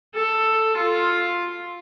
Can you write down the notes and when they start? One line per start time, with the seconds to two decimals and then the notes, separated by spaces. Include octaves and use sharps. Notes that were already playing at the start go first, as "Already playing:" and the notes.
0.15 A4
0.77 F4